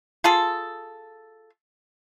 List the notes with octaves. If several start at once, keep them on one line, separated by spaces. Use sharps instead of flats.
F4 G#4 A4